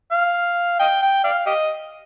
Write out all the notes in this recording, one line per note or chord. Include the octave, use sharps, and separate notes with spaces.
F5
D#5 G5
G5
D5 F5
G4 D#5